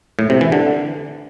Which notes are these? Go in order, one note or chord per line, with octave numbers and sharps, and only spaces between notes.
A2
C3
E3
D3